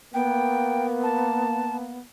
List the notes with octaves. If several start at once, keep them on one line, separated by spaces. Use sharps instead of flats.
A#3 B3 G5
A5